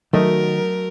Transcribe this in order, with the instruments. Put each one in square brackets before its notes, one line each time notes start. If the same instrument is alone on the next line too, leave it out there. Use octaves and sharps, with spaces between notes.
[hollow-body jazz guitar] D#3 [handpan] F#3 [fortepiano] A3 D#5 [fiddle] A#4